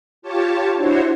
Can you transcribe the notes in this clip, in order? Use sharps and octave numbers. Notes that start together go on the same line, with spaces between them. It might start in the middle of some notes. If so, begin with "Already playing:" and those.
F4 G4 C#5 A5
D4 E4 F#4 C5 C#5